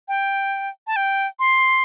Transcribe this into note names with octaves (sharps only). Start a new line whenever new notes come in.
G5
A5
G5
C6